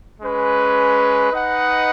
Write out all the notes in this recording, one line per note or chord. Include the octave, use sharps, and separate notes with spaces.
G#3 C#4 B4
D#4 B4 D#5 F#5